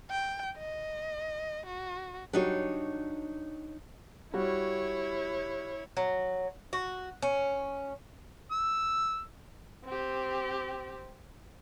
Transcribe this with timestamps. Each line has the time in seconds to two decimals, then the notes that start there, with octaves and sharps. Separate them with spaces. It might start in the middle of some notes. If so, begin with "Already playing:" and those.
0.11 G5
0.57 D#5
1.66 F#4
2.33 F#3 G3 D4 D#4 F#4 C#5
4.34 G3 E4 F#4 C#5
5.97 F#3
6.73 F#4
7.22 C#4
8.52 E6
9.85 C4 G4